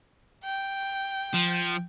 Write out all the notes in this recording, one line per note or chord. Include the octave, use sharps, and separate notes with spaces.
G5
F3